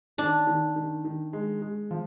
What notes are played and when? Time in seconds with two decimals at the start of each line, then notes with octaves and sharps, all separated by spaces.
0.18 D#3 D4
0.47 D#3
0.76 D#3
1.05 D#3
1.33 G#3
1.62 G#3
1.91 F3